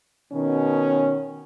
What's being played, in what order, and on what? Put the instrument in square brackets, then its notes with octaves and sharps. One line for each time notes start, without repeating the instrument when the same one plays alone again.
[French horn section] B2 D#3 C#4